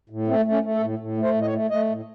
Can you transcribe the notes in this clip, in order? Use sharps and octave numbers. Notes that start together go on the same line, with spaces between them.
A2
A3 C4
A3
C#4
A3
A4
A2
A2
A3
C5
A2
D#5
C#5
A3
A3 D#5
A2